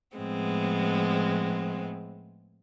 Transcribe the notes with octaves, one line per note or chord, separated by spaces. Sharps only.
A2 F3 G#3 B3 C4